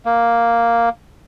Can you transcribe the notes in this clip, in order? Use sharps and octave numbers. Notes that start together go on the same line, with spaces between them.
A#3